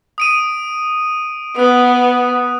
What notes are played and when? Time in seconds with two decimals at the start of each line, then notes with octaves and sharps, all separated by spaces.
0.18 D#6 D7 D#7
1.56 B3 D#6 F#6